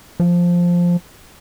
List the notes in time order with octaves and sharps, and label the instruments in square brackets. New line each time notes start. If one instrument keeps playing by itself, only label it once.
[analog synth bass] F3